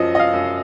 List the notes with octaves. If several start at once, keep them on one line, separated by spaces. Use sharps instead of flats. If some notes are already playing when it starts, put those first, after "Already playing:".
Already playing: F#2 F3 D#5
D#5
F5
F#2